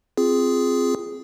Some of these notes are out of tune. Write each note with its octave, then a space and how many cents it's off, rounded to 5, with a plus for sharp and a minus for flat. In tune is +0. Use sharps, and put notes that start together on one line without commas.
C4 +0 F4 +0 G#4 +0